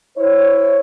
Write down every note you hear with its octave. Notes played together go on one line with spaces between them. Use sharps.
E4 C5 C#5